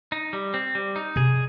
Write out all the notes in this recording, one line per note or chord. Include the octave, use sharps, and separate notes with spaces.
D#4
G3
C4
G3
D#4
C3 G#4